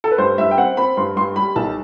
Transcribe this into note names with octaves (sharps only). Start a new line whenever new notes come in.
A4
B4
G2 C5
G2 E5
G5
C4 F#5
C4 B5
G2 C6
G2 C6
G3 B5
B1 A5